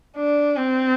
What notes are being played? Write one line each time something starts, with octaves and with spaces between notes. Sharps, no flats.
D4
C4